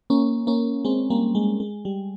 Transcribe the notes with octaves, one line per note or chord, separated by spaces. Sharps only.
A#3 C#4
A#3 C#4
G#3 C4
G3 A#3
G#3
G#3
G3